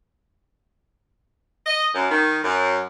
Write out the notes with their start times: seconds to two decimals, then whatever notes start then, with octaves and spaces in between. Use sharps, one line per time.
1.66 D#5
1.94 F#2
2.10 D#3
2.42 F#2